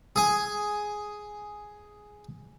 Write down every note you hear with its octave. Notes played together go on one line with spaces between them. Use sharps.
G#4 G#5